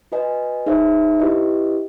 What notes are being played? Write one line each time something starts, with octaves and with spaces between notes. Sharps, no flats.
F#4 B4 D#5 G#5
D#4 G#4 C5 E5
E4 G4 B4 D#5